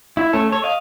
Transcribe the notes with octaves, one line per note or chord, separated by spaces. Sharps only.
E4
A3 C#4 A4
A4 C#5
D#5 F5